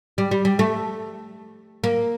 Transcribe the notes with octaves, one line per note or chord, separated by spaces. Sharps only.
G3
G3
G3
A3
A#3